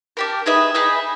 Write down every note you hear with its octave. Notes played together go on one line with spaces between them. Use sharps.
D4 G4 A#4
D#4 G#4 B4 E5
D#4 G#4 B4 E5